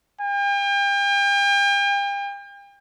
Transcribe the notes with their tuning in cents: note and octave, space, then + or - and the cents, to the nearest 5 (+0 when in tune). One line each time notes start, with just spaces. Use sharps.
G5 +40